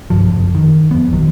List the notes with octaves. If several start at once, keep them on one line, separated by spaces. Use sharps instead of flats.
C2 G2 F3
F#1 F2
D#3
F2 B3
A#1 F2 D#3 F#3